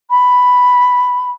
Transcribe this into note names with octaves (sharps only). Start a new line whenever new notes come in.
B5